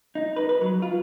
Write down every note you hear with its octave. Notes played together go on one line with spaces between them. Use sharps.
D#4
B4
B4
F#3
F4